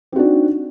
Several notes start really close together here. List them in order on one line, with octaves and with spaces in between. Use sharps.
C4 F#4 D4 D#4